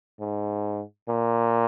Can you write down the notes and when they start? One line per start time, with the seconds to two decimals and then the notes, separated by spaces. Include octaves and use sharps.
0.20 G#2
1.08 A#2